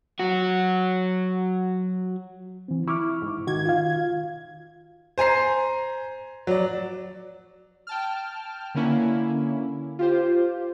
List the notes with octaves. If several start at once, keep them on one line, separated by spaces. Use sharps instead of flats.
F#3 F#4
E3 C4
E4 C#6 D6 F6
G#2
D#3 F#4 G#6
F4 F5
C5 G#5 A#5 C7
F#3 D5
G5 A5 F6
D3 A#3 C#4 E4
F4 G4 C5